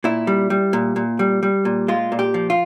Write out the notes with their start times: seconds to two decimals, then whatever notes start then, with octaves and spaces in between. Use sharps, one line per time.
0.04 A#2 E4
0.27 G3
0.50 G3
0.73 A#2
0.96 A#2
1.19 G3
1.43 G3
1.65 A#2
1.88 G#3 F4
2.12 A#2
2.19 G4
2.34 F3
2.50 F4